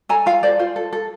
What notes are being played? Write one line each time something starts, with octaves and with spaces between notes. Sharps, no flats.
A4 G#5 A#5
F4 F5 G5
A4 C5 D5
F4 C5
A4
A4